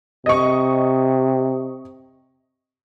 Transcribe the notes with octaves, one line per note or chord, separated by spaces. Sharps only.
C3 D#5 C#6